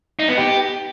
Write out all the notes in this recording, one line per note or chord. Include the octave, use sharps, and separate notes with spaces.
D#4
B3
G4